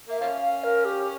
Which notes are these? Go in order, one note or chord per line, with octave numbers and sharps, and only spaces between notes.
A#3 E5
F3 A#3 C#4 F5
F5
A#4
G4